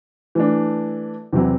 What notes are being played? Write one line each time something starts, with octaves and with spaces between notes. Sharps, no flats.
E3 A3 D4
E2 C3 F#3 C4 E4